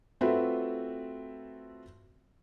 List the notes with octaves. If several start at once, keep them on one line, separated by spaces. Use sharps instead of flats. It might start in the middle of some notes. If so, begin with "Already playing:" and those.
A3 C4 F4 F#4 B4 E5